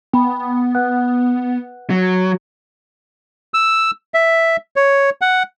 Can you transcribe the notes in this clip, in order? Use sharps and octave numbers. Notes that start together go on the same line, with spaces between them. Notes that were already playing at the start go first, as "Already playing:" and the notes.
B3 G5 B5
B4 F#5 F#6
F#3
E6
E5
C#5
F#5